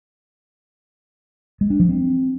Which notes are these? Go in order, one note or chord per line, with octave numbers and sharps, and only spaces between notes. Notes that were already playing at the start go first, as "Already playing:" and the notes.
G#3
D4
F3
C4